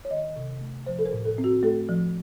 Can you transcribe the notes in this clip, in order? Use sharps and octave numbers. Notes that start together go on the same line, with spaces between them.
C#5
D#3 D#5
C3
A3
F3 C5
A4
A#4
A2
A4
C4
F#4
A3 A4
F3